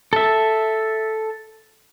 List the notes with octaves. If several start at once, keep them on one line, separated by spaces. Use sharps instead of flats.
A4 E5